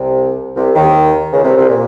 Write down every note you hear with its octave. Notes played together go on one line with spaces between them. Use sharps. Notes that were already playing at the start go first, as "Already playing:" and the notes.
Already playing: C2 C3
C2 C3
D#2 D#3
C#2 C#3
C2 C3
C2 C3
A#2